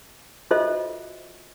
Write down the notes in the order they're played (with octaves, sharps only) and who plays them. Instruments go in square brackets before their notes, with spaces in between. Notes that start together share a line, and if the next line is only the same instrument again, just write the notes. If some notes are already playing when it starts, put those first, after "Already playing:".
[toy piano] F4 F#4 A4 C5 D#5 E5